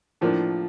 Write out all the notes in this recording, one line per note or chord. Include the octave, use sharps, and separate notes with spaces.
A2 F3 A#3 D4